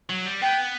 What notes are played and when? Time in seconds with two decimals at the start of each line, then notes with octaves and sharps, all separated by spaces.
0.10 F#3
0.26 G3
0.41 B3 G5